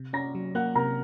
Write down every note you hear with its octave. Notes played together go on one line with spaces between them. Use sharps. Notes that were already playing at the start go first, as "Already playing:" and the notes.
Already playing: C3
C#4 A#5 A#6
F#3
A#3 F#5 F#6
C3 A#4 A#5